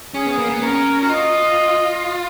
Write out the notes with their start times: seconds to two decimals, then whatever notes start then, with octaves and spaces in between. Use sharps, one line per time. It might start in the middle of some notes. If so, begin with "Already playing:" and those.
0.14 C#4 G#4
0.26 B3
0.38 A#3
0.50 B3
0.62 C#4 A#4
1.03 F#4
1.10 F4 D#5